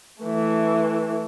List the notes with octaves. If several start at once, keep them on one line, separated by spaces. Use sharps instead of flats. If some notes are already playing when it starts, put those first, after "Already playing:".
E3 A3